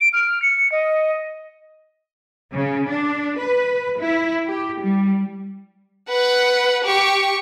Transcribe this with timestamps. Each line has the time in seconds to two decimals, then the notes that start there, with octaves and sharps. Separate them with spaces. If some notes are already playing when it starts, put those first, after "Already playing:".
0.01 D7
0.13 F6
0.42 C#7
0.72 D#5
2.53 C#3
2.88 D4
3.38 B4
3.99 E4
4.46 G4
4.80 G3
6.09 B4 F#5
6.84 G4 C#6